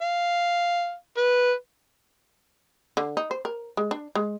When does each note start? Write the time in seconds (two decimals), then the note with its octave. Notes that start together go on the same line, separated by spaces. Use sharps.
0.02 F5
1.17 B4
2.97 D3
3.17 D#4
3.31 C5
3.45 A#4
3.77 G#3
3.91 D4
4.15 G#3